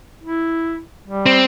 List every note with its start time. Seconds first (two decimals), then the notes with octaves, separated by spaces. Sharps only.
0.24 E4
1.06 G3
1.26 C4